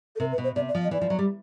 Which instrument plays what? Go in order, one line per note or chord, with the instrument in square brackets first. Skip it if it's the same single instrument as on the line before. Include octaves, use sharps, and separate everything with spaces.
[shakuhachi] A4
[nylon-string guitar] C3 [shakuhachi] A#4
[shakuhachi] B4
[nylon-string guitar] B2
[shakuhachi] C5
[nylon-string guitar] C3 [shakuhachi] D5
[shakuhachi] D5
[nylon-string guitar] F3
[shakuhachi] D#5
[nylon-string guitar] E3 [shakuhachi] D5
[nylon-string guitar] F3
F#3
G3